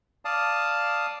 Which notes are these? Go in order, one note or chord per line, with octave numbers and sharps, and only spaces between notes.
D5 F5 A5 D#6